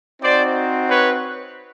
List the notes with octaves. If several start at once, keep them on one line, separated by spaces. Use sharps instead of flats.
C4 D#4 F#4 C5 D5
B4 C#5